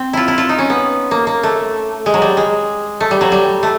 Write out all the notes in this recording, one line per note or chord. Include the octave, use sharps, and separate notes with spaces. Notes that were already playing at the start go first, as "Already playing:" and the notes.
Already playing: C4
E4 F4
E4
F4
D#4
C#4
B3
A#3
A#3
A3
G#3
F#3
G3
G#3
A3
G3
F#3
G3
A3